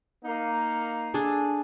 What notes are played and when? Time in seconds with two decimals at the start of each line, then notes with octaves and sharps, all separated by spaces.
0.24 A#3 D#4
1.14 D4 G#4 A4